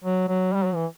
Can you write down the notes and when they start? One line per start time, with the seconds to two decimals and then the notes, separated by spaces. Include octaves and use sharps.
0.04 F#3
0.29 F#3
0.53 G3
0.65 F#3
0.75 E3